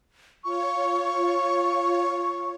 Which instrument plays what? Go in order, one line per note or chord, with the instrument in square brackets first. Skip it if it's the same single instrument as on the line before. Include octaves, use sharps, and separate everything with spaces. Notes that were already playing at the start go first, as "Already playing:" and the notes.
[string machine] F4 C#5 [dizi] C#6